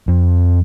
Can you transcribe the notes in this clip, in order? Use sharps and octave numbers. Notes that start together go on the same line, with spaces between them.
F2